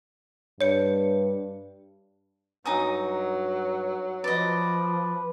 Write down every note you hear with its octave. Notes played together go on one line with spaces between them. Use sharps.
G2 C#5 C#7
G2 F#3 D#4 G#5 D#6
F3 B4 D5 D#5